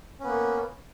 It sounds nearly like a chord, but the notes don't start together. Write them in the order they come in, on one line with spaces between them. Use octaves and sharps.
C#4 B3 A#3